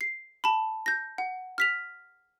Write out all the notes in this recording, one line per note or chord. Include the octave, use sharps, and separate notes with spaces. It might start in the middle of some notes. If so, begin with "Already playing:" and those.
C7
A5 B5
G6 A#6
F#5
F6 B6 F7